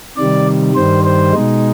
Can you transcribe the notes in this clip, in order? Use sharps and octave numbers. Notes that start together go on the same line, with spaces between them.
C3 D#3 G3 D5
G2 D#3 G3 C5
C5
B2 G#3 D#4